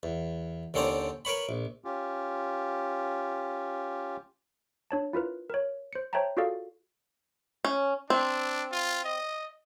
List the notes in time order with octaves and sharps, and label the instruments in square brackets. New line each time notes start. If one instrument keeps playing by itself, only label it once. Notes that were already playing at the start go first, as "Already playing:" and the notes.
[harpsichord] E2
D#2 D3 C4 C#4 D5 A#5
A#4 B4 C#5 B5
A#1
[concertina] C#4 F4 G4
[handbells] D4 C#5 A5
E4 F4 A#4 B4
A#4 C#5
C5 C#7
C5 C#5 E5 G5 A5 A#5
F4 F#4 G#4 A4 D5 F5
[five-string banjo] C#4
[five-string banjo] C4 [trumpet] D4
[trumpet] F4
D#5